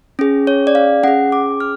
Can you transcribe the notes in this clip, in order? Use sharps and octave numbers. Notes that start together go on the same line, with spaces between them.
C#4 G#4
C#5
D5
F5
C#4 G#4 F#5
D6
F6